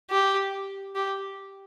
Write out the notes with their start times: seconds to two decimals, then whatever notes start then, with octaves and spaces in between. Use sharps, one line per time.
0.10 G4
0.95 G4